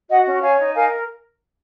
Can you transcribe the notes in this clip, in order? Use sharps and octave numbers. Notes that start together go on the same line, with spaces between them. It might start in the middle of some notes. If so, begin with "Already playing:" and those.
F#4 D#5 F#5
C#4
C#5 F5 G#5
D#4
A#4 F5 G#5